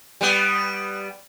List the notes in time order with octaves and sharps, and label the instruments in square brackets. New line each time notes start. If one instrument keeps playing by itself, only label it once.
[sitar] G3 B3